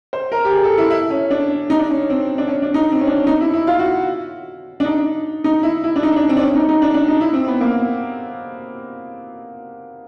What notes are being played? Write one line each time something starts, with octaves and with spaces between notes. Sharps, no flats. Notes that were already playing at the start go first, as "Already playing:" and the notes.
C5
A#4
G4
G#4
A4
E4
E4
C#4
D4
D#4
D4
C#4
C4
D4
C#4
D4
D#4
C4
C#4
D4
D#4
E4
E4
F4
F#4
D4
D#4
D#4
E4
E4
D4
D#4
D4
C4
D4
C#4
D#4
D#4
D4
D4
D#4
E4
C4
B3
A#3